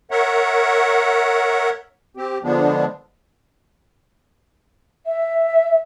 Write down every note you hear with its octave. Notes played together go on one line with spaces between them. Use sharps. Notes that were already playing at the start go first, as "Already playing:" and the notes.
A#4 C#5 E5 F#5
C4 G4
D3 F3 G#3 B3 D4
E5